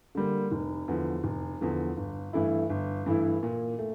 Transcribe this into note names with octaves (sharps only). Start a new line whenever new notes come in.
D3 G3 A#3
F1
E2 D3 F3
F1
E2 D3 F3
G1
G2 E3 A3 E4
G1
G2 E3 A3 E4
A#2
A3